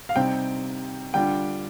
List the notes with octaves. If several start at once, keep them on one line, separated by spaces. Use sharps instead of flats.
F5
C3 G3 C4 D#4 G5
D3 G3 D4 F4 G5